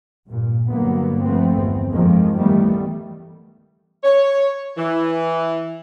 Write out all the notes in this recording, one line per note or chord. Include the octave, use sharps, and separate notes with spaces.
G2 A#2
G2 D3 F#3 A#3 B3
F3 A3 B3 C4
G1 E2 C4
F2 D#3 F3 G#3 A#3
D#3 E3 G3 A3 B3
C#5
E3